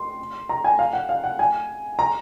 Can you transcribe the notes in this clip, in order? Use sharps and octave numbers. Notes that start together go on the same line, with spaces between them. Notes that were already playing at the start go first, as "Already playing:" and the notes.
Already playing: C6
A#5
G#5
F5
F#5
F5
F#5
G#5
A#5